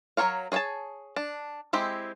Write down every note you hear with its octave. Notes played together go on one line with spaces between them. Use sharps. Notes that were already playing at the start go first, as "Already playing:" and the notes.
F#3 F#4 A#4 C#5 F5
G#4 C#5 F#5 G#5 A5
D4
G#3 C4 E4 G4